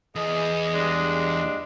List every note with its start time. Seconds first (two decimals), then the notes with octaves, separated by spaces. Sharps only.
0.15 E2 G#4 D#5
0.74 G2 G#3 D4